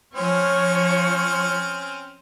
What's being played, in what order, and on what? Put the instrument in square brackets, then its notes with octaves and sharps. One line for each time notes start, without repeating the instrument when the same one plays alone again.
[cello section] F3 C#5 [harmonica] C4 C#4 F6